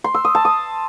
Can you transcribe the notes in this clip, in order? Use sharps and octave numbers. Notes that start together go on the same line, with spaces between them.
C6
E6
D#6
A5
D#6